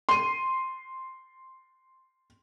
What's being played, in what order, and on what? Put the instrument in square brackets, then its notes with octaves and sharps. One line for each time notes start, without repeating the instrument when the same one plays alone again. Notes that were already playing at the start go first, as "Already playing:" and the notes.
[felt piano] C6 D#7